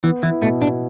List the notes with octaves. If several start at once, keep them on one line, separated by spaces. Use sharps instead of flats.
E3 B3
E3 E4
B2 A3
B2 D4